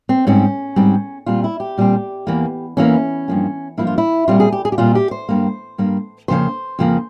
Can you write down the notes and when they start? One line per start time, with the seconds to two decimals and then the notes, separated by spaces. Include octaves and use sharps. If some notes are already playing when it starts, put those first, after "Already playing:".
0.09 C4
0.27 G#2 G3 C4 C#4
0.76 G#2 G3 C4
1.26 A#2 G3 C4 F4
1.44 E4
1.60 G4
1.78 A#2 G3 C4
2.27 E2 E3 A#3
2.77 E2 E3 A#3 C#4
3.28 G2 F3 A#3
3.78 G2 F3 A#3 E4
3.87 F4
3.98 E4
4.28 A#2 G3 C4 F4
4.40 G#4
4.52 G4
4.65 G#4
4.72 G4
4.78 A#2 G3 C4 F4
4.95 G4
5.11 C5
5.29 G2 G3 A#3
5.78 G2 G3 A#3
6.28 F2 C#3 F3 A#3 C5
6.79 F2 C#3 F3 A#3